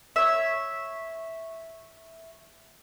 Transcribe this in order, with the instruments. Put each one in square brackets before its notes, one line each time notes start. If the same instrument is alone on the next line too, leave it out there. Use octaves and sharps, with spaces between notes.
[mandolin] C#5 E5